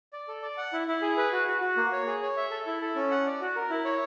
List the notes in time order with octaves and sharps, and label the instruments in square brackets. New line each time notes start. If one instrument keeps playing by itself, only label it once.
[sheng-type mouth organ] D5
A4
D5
F#5
E4
E4
G#4
B4
F#4
F#4
F#4
A#3
C#5
G#4
C#5
E5
A4
E4
A4
C#4
F#5
D5
F#4
A#4
E4
C#5